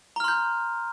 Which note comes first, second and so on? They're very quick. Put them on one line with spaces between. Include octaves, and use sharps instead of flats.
A#5 F6 C6 G6